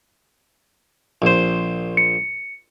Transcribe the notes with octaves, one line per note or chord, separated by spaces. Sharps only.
A#1 C5
C#7